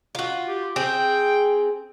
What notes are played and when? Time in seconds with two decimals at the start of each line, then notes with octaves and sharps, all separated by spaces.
0.15 F4 F#4
0.48 G4
0.76 C4 G#4 G5